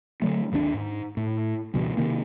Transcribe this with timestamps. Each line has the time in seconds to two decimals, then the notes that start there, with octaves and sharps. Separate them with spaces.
0.22 D3 F#3 A3
0.52 G#1 D#2 B2 D4
0.74 G#2
1.17 A2
1.74 C#2 G2 B2 E3
1.97 C3 D#3 A#3